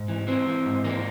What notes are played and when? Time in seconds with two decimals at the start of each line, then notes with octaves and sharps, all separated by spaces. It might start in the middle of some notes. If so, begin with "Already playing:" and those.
Already playing: G#2
0.08 E3
0.27 E3 C4
0.47 E3
0.66 G#2
0.84 E3 A#3